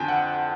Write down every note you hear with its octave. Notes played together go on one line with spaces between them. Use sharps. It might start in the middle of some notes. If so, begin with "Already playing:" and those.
Already playing: F2 D3 G5 G#5
F#5